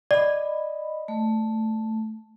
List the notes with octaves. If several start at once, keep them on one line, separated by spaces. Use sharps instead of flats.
D5 D#5 B5
A3